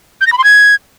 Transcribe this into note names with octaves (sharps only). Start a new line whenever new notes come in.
G6
A#6
B5
C6
G#6